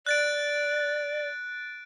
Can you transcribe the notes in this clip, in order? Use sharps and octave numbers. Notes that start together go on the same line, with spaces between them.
D5 F#6 A6 D7